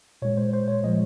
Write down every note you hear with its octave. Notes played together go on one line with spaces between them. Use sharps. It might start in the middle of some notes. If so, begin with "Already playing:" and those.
A#2 G#3 C#5
C5
C5
C#5
A#2 F3 G#3 D#5